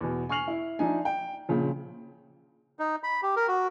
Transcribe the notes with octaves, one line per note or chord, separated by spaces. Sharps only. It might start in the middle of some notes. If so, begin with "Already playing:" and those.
E2 B2
G#5 C#6 F6 C7 F7 F#7
E4
F3 D4 D#4 E5 G#5
G5
A#1 A#2 C#3 F3
D#4
B5
G4
A#4
F#4